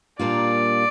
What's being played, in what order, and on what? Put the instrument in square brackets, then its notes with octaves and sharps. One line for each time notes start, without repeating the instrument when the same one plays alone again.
[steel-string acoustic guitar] A#2 G3 A#3 D4 F4 [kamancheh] D5